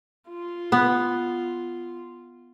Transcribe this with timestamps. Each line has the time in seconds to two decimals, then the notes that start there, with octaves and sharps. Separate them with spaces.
0.29 F4
0.72 B3